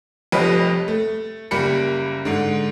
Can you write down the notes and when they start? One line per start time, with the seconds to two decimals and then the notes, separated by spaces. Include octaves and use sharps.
0.32 F1 F2 G3 B4 C#5 D#5
0.88 A3
1.51 F#1 G3 A#3 B5 C#7
2.25 G#2 D3